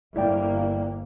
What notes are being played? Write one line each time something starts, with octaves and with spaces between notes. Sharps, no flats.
G1 A#3 E4 D5 G5